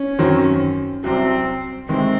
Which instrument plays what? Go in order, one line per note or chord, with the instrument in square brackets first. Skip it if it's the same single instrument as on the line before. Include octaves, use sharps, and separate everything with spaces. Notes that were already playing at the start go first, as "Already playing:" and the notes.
Already playing: [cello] C#4
[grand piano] F#2 D#3 F#3 C4
[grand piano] C2 C3 F#3 [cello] C4
[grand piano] C3 D#3 G#3 [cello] C4